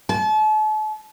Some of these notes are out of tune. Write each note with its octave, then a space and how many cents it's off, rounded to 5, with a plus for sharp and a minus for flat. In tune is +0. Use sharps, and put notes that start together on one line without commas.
A5 -40